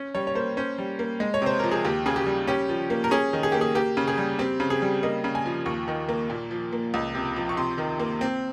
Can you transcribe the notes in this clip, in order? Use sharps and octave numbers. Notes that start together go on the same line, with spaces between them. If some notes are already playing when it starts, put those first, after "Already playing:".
Already playing: C#4
G3 C#5
C#5
A#3 C5
C#4 C5
G3
A#3
G#3
C#5
C3 C5
F3 A#4
G#4
D#2 G4
C#3 G#4
G4
G3
C#4 G4
F3
A#3
A#4
C#4 G#4
D#3
G#4
A#3 G4
G#4
A#3 G4
C#3
G#4
G3
C4 G4
C#3
G#4
G3
A#3 D#5
C#3
G#5
F3
D#2 C#6
D#3
A#3
A#2
F3
A#3
C#2
C3
F3
C#6
C3 C6
D#3
A#3
C4